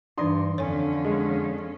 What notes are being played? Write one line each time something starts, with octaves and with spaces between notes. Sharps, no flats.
G2 E3 D4 D#4 D5 C6 D#6
F2 D3 C#4 C#5 G#5
G#3